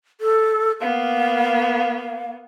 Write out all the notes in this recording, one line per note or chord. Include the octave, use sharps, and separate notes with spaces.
A4
A#3 B3 F5